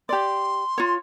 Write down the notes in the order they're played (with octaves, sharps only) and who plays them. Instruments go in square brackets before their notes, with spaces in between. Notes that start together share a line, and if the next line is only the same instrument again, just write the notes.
[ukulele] G4 D5 [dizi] C6
[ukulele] F4 C#5